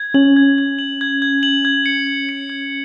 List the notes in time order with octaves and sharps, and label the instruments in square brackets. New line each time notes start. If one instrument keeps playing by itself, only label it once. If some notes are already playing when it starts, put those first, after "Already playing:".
Already playing: [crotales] G#6
[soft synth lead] C#4 [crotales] F#7
[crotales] G#6
G#6
F#7
G#6
G#6
F#7
G#6
C#7
C#7
C#7
G#6